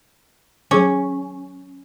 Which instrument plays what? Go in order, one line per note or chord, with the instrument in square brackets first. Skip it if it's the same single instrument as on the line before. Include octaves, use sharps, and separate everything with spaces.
[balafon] F#3 G#4 D6 [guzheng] C#4